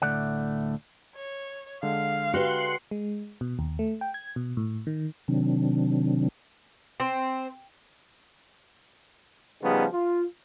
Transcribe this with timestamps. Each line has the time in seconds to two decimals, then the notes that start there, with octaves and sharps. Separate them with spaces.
0.02 D2 A2 E3 A3 D5 F#5
1.16 C#5
1.83 D3 G#3 F5
2.34 F#4 G4 B4 C6 F#6 C#7
2.91 G#3
3.41 B2
3.59 D#2
3.79 A3
4.01 G5
4.14 G#6
4.36 B2
4.57 A2
4.87 D#3
5.28 C3 D#3 F#3 C4 D4
7.00 C4
9.63 C#3 F3 G3 B3 D#4 G#4
9.93 F4